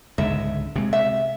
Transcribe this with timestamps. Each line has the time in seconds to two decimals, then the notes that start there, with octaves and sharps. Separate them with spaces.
0.18 C#2 G#2 D3 E5
0.76 C3 G#3
0.93 E5